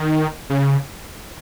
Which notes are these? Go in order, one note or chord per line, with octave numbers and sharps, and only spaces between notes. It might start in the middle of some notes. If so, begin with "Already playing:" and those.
Already playing: D#3
C#3